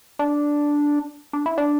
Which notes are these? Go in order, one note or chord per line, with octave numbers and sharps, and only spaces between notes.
D4
D4
E4
D4